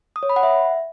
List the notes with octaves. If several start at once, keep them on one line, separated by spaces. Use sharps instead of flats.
D#6
C#5
B5
F#5
E5